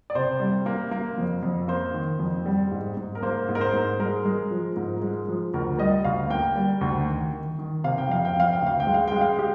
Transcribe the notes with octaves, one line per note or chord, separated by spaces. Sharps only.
D5
C3 C5
G3
A#3
A#3
F2
F2
A#3 C5
D#3
F2
G3
G#2
G#2
A#4
A#3 C5
G#2
A#4
C5
G#2
G#3 A#4
G#3
F3
G#2
G#3
F3
D2 A#4
G3 D#5
D2 F5
A#3 G5
G3
D2
D#3
D#3
D#3
C3 F5
G5
F2 F5
G5
F2 F5
G5
D2
F5
G5
G#3
F5
G#3 G5
F5
G4